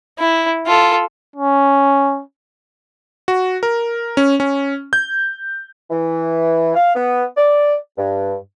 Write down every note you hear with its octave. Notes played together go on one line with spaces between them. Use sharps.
E4
F4 A4
C#4
F#4
A#4
C#4
C#4
G6
E3
F5
B3
D5
G2